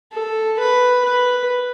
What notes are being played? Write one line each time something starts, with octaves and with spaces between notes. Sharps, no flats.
A4
B4
B4